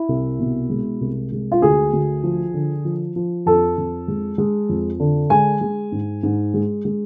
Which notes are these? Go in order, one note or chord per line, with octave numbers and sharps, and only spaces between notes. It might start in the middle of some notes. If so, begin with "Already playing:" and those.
Already playing: E4
C2
B2
G#3
C2
G#3
F4
D2 G#4
D2
F3
D3
F3
F3
F2 A4
F2
G#3
G#3
F2
D3
G#3 G#5
G#3
G#2
G#2
G#3
G#3